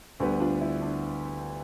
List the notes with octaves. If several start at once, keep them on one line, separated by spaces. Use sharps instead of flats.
D2 D3 G3 B3
D4 F4
E4
D4